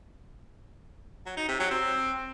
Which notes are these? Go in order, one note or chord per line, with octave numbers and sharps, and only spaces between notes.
F#3
D#4
C3
F#3
C4